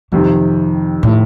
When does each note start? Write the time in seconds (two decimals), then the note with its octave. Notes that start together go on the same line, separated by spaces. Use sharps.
0.12 F2 C3 D#3 F#3
1.03 A2